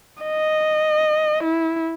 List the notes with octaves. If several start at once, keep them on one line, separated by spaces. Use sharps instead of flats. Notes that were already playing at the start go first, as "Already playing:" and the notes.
D#5
E4